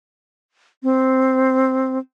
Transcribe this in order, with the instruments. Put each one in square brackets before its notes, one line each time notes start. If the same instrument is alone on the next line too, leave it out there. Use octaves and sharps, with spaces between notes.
[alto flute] C4